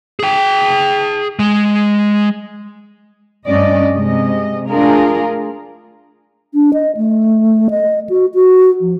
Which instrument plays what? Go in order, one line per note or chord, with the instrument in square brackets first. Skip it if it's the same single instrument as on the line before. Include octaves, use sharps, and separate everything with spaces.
[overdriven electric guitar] G#4 G5
G#3
[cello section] G2 A3 C#4 D5 D#5
C3 G#3 D#5
A3 D4 F4 G#4 A#4
[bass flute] D4
D#5
A3
D#5
F#4
F#4
F3